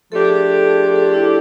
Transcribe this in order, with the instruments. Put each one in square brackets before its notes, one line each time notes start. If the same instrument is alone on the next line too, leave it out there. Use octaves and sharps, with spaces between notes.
[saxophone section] F3 A3 D4 G4 [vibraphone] A4
[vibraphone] G#4
A4
A4
G#4
A4
A4
G#4
E4